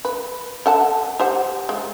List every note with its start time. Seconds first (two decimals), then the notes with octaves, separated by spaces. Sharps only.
0.05 B4
0.66 A4 F#5 A5
1.20 G4 C5 F#5
1.69 G#3